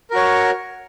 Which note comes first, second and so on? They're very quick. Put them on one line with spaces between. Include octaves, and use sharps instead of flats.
A#4 F#4 C#5